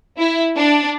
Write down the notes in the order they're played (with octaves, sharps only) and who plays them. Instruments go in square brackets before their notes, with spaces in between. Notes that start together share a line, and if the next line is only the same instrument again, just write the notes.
[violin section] E4
D4